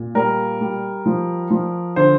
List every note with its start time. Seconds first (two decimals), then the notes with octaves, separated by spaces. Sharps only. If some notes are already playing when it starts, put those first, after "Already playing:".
Already playing: A#2
0.15 G3 A#4
0.61 G3
1.06 F3
1.50 F3
1.96 D3 C5